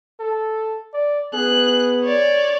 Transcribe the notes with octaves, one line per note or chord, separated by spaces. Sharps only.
A4
D5
B3 G#4 F#6
C#5 D5